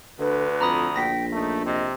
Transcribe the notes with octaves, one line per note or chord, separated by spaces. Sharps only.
D2 D3 B4
F2 A#5 B5 D#6
A#1 G5 A#6 B6
A3 D#4
C3 D#5